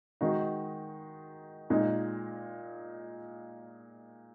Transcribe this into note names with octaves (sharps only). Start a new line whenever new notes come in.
D#3 G#3 D#4 F#4
A#2 G#3 D#4